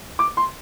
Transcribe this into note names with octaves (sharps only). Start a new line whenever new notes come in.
D6
C6